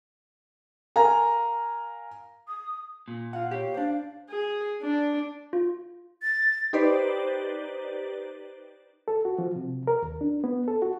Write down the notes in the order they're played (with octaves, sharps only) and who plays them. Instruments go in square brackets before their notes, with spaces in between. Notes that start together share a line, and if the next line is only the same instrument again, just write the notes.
[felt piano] A#4 F5 G#5 A#5
[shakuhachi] D#6
[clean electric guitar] A#2
[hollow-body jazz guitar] F4 F#5 [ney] F5
[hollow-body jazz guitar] G4 C#5
D4 C5
[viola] G#4
D4
[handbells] F4
[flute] A6
[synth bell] D#4 G4 B4 C5 D5
[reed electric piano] A4
F#4
F3
C3
A#4
D#2
D4
B3
A4
F#4